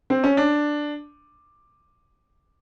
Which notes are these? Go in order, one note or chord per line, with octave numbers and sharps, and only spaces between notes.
C4
C#4
D4